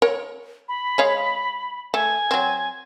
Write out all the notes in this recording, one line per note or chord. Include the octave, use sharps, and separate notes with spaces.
A#4 C#5
B5
G#3 C#5 F5
A3 G#5
F#3 C4